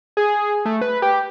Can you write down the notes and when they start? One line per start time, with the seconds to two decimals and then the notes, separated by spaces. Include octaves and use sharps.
0.17 G#4
0.65 A3
0.81 B4
1.02 G4